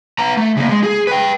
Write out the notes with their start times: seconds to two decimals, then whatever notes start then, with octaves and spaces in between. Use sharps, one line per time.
0.19 B3 A#5
0.37 A3
0.57 C#3 A#3
0.69 G#3
0.83 G#4
1.07 B4 G5